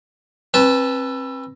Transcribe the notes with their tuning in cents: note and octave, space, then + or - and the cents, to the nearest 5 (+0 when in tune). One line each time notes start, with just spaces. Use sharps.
C4 +35 B4 -5 A5 -10